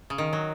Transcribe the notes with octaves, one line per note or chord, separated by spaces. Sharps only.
C#3
D#3
F#3